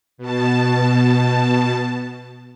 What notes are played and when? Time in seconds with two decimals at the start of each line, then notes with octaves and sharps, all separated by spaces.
0.18 B2 A5